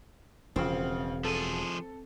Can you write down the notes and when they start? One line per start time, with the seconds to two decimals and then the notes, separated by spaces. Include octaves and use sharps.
0.56 E1 C#3 F3 C4
1.25 F3 G#4 A4